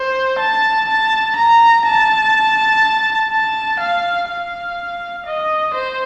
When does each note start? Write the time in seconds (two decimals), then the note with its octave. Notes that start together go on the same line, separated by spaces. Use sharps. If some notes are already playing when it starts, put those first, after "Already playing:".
Already playing: C5
0.39 A5
0.88 A5
1.36 A#5
1.85 A5
3.31 A5
3.80 F5
4.28 F5
5.26 D#5
5.74 C5